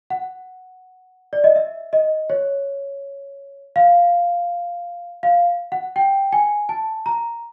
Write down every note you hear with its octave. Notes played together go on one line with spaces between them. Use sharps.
F#5
D5
D#5
E5
D#5
C#5
F5
F5
F#5
G5
G#5
A5
A#5